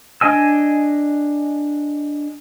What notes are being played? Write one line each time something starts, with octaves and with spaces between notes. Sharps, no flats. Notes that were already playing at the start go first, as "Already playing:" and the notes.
D4 D#5 G#5 E6